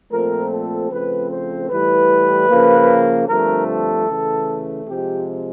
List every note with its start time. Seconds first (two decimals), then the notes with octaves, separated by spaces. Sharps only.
0.11 A#2 F3 A3 C4 A#4
0.51 A4
0.90 C#3 F3 A3 C4 B4
1.30 C5
1.69 A2 E3 G3 B4
2.49 C#3 F3 A#3
3.28 G2 D3 F3 A3 C4 A#4
3.68 A4
4.07 C#3 E3 A3
4.86 C3 F3 G#3 G4